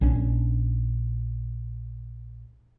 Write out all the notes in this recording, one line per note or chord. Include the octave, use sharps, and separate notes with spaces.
A#1 C#4 D4